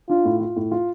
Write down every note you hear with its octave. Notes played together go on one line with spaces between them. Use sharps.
D4 F4
A2
F4
A2
F4